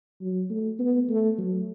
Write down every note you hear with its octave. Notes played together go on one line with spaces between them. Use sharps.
F#3
A3
B3
A3
F#3